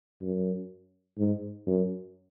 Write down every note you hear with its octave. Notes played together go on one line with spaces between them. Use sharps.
F#2
G#2
F#2